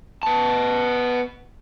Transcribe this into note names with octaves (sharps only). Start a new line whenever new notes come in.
B3 A5